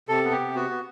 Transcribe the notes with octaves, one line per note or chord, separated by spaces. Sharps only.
C3 A4
B3
G4
C3
B3 F#4
B3